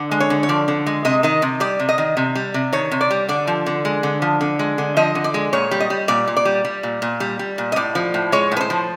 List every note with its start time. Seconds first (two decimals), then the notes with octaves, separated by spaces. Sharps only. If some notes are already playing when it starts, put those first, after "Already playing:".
Already playing: D3
0.11 G#3
0.20 C#5
0.30 D3
0.43 C#5
0.49 F3 D5
0.68 D3
0.86 G#3
1.05 C3 D#5
1.23 D#3 D#5
1.42 C3
1.60 G3 D5
1.80 C3
1.89 D#5
1.98 D#3
2.17 C3
2.35 G3
2.54 C3
2.73 D#3 C#5
2.91 C3
3.01 D5
3.11 G3
3.29 D3 D5
3.47 F3
3.66 D3
3.85 G#3
4.03 D3
4.22 F3
4.41 D3
4.59 G#3
4.78 D3
4.97 F3 D#5
5.15 D3
5.24 D5
5.34 G#3
5.53 A#2 C#5
5.71 G3
5.80 D#5
5.90 G3
6.08 A#2 D5
6.27 A#2
6.37 D5
6.45 G3
6.65 G3
6.83 A#2
7.02 A#2
7.20 G3
7.39 G3
7.58 A#2
7.72 D#5
7.76 A2 D5
7.95 F3
8.14 A2
8.32 G#3 C#5
8.52 A2 B4
8.61 C5
8.70 F3